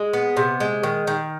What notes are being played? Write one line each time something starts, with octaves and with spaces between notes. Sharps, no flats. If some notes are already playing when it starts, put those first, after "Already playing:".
Already playing: G#3
B3
C3
G#3
D#3
D#3